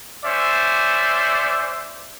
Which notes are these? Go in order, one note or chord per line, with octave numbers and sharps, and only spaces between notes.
C#4 C5 D5 E5